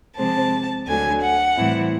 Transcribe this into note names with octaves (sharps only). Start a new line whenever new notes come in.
C3 F3 G#3 C4 A5
D2 D3 F#3 G#5
F#5
A2 E3 G3 C4 E4